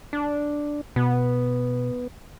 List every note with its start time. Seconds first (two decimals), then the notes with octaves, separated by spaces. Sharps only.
0.13 D4
0.96 B2 B3